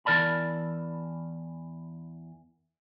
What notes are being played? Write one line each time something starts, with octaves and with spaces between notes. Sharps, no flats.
E2 E3 A#4 D5 A5 B5